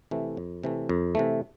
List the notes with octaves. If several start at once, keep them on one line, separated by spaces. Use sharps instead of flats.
C3 E3 A3
F2
C3 E3 A3
F2
C3 E3 A3